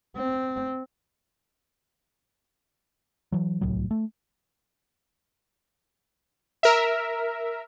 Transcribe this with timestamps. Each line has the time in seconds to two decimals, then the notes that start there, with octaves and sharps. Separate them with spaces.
0.17 C4
3.32 E3 F#3
3.61 D1 C2 A2 F#3
3.91 A3
6.63 A#4 E5